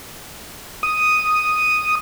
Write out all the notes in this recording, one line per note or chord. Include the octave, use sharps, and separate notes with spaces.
D#6